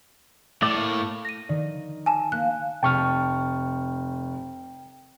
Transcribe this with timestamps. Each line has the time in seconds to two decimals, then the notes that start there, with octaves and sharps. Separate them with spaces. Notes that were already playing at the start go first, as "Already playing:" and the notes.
0.62 A2 A3 D5
0.77 A3 A#3
1.25 A#6 D#7
1.49 D#3 D5
2.06 G#5 A5
2.32 A#3 F#6
2.83 F1 G5 A5 C#6 F6